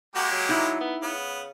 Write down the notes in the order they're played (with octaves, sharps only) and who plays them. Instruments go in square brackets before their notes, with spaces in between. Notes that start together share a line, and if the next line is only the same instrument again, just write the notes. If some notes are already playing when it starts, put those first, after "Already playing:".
[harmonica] G#3 A#3 G4 [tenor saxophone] F#4
[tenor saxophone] F#3
[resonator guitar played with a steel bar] D#4 E4
[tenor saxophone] B3
[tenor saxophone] C#3 [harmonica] B3